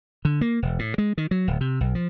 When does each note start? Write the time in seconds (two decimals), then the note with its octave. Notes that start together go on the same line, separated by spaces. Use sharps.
0.25 D3
0.41 A#3
0.62 E1
0.79 A2
0.98 G#3
1.18 D#3
1.31 F#3
1.48 D1
1.61 C3
1.81 B1
1.95 F3